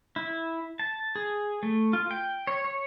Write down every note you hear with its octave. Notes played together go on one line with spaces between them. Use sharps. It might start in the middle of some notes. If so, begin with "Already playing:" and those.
E4
A5
G#4
A3
F4
G5
C#5
C#5